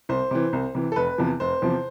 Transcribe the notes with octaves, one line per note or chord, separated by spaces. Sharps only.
C2 C5
C3 E3
C2
C3 E3
A4
F1 B4
E2 C3 F3
F1 C5
E2 C3 F3